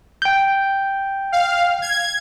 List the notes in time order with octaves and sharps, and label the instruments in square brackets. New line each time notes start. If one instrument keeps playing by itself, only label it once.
[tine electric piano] G5 G6
[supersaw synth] F5
G#6